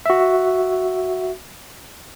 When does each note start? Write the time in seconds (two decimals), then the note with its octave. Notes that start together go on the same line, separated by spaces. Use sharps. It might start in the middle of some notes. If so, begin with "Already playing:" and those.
0.06 F#4 E5